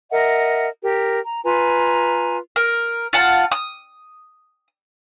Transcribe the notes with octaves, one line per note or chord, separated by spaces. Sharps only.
A#4 D#5 E5 F#5
G4 A#4
A#5
F4 B4 G#5 A#5
A#4
F4 F#5 A5
D#6